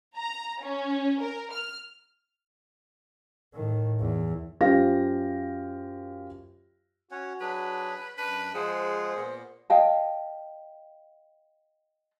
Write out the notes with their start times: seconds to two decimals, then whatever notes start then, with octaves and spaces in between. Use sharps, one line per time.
0.16 A#5
0.61 C#4
1.21 A#4
1.52 F6
3.54 A2 D#3
4.00 E2
4.61 F#2 F4 G4 C5 F5 A#6
7.11 C#4 F#4 C#5 F#5
7.41 F#3 D4 G#4 B4
8.18 F#2 D4 B4
8.54 F3 G#3 G#4 C5 F#5
9.16 A#2 B3
9.70 D#5 F5 G5 A5